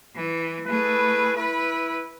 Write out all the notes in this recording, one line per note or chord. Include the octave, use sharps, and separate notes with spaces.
E3
A3 E4 G#4 B4
E4 B4